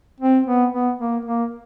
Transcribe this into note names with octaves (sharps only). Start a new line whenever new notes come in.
C4
B3
B3
A#3
A#3